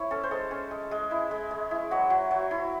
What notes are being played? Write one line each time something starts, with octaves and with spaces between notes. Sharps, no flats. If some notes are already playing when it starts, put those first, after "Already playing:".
Already playing: E4 C#5
C#4 A4
C5
G#3 A4
C#4
G#3
G#3
E4
G#3
G#3
E4
F#3 F#4
F#3
F#3
E4